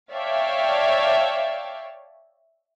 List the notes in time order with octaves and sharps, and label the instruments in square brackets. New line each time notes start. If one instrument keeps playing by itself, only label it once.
[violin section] C#5 D5 E5 F5 G5 A5